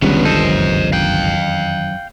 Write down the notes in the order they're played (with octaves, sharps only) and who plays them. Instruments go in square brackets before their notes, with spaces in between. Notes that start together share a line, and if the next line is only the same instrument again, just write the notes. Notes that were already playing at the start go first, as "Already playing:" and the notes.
[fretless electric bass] G1 C#2 G2 [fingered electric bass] D#3 E3 [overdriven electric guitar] B3 C#4
[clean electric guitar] A4 [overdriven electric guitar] C5 D#5
[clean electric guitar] F#2
[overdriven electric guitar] F5 G5